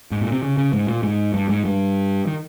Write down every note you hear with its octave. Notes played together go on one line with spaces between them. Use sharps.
G#2
A#2
C3
C#3
C#3
G#2
A#2
G#2
G2
G#2
G2
D#3